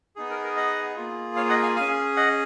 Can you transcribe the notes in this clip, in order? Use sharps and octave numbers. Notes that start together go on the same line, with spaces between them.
B3 D#4 G#4
A#4
A#4
D#5 F#5
A#3 F4 G#4
C#5 F5
D#5 F#5
F5 G#5
C#4 G#4 F5 G#5
D#5 F#5